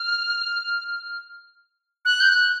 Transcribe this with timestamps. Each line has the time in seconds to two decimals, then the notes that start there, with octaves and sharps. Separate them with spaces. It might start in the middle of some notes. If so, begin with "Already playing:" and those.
Already playing: F6
2.05 F#6
2.20 G6
2.29 F#6